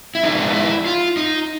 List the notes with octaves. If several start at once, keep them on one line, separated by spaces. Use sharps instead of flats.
E4
F3 G#3 B3 D4 D#4
E4
F4
D#4